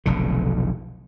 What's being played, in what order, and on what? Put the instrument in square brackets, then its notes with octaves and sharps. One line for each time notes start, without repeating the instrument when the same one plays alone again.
[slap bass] F1 B1 D3